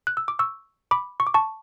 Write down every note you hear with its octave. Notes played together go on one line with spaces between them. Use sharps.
F#6
E6
D6
C#6 E6
B5 D6
C#6
D6
A5 C#6